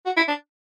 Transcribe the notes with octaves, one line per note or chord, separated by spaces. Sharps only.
F#4
E4
D4